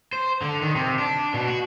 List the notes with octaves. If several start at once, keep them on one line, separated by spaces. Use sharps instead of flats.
C5
D3
D#3
C3
D4
B2
F#4